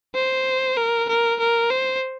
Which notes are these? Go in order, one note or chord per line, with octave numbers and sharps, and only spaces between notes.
C5
A#4
A#4
A#4
C5